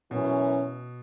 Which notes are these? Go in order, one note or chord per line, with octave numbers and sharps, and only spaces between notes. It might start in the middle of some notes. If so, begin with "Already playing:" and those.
F#2 B2 E3 C#4